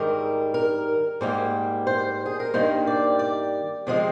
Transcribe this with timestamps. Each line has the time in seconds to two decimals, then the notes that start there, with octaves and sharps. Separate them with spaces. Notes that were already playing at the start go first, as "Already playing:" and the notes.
Already playing: G#2 D#3 G3 A#4
0.54 A#4
1.21 G#2 G3 A#3 C5
1.87 C5
2.26 G#4
2.40 A#4
2.54 G2 D#3 G3 A#3 C5
2.87 D5
3.19 D5
3.87 C3 F3 G#3 C4